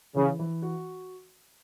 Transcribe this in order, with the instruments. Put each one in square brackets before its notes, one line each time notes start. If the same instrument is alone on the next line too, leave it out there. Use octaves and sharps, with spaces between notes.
[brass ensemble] C#3 [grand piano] E3
[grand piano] E3
F#4